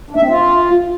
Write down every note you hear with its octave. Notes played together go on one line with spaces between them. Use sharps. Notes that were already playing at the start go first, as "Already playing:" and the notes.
D4
E5
C4
F4